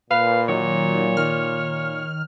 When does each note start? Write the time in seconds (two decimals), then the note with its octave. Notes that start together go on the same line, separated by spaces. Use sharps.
0.11 A#2 B4 F5
0.49 D#3 F#3 C#5
1.17 D#3 F6